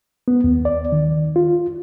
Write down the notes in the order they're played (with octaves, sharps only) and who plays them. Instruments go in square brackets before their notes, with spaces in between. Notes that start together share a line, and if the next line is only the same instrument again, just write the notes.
[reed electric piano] B3
D#2
D5
D#3
F4